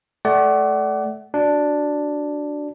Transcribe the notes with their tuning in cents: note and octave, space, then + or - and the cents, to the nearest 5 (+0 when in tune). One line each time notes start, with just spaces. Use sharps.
A3 -20 D5 -10 F#5 +30
D4 +0 F#4 +0